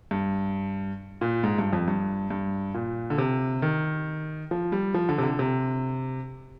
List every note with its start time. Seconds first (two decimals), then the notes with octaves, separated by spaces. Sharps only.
0.11 G2
1.21 A#2
1.44 G#2
1.58 G2
1.73 F2
1.88 G2
2.30 G2
2.74 A#2
3.10 D3
3.18 C3
3.62 D#3
4.51 F3
4.72 G3
4.94 F3
5.09 D3
5.18 C3
5.23 D3
5.39 C3